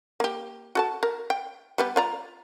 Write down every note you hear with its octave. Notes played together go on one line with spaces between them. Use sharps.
A#3 G4
F#4 A4 A5
A#4
G5
G3 B3 G4
F4 D5 A#5